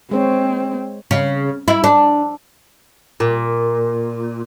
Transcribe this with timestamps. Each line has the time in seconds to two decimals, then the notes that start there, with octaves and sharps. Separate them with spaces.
0.11 G#3 C4 C5 C#5
1.11 C#3
1.68 E4
1.84 D4
3.20 A#2